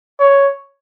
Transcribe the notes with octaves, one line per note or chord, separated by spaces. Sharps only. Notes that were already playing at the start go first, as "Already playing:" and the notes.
C#5